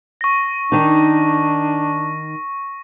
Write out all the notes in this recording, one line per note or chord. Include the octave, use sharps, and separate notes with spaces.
C#6 A#6
D#3 D4 D#4